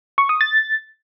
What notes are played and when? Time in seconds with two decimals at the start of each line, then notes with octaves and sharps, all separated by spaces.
0.18 C#6
0.29 D#6
0.41 A6